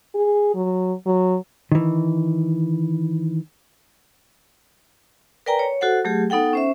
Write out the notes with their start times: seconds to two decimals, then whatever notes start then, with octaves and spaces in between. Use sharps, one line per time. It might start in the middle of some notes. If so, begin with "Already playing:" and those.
0.15 G#4
0.54 F#3
1.06 F#3
1.72 D#3 E3
5.46 A#4 B4 D5 G5 G#5 A#5
5.59 C#5
5.81 F#4 A4 C5 F#5
6.05 F#3 A3 G4 G#4
6.30 B3 D#4 A4 F#5 G5
6.53 C#4 C5 E5